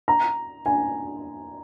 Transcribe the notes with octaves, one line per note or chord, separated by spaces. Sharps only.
A#5
G#5